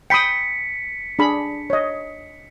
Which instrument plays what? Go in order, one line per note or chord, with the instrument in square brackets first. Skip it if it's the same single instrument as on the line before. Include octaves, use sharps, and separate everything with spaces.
[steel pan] G5 B5 D#6 [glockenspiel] B6 C#7
[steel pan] D4 G#4 B5
C#5 D#5